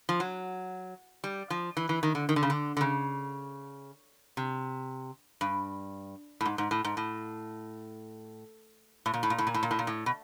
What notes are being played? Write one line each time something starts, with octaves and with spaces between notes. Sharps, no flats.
F3
F#3
G3
F3
E3
E3
D#3
D3
D#3
D3
C#3
D3
D3
C#3
C3
G2
A2
G#2
G#2
A2
G#2
A2
A2
A#2
A2
A#2
A2
A#2
A2
A#2
A2
A#2
A2
B2